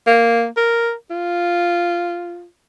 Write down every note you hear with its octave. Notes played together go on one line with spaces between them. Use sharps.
A#3
A#4
F4